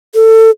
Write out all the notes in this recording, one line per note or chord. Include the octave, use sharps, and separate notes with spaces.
A4